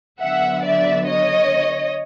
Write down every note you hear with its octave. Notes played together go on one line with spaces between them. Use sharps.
D3 F#3 B3 E5 F#5
D5 E5
C#5 D#5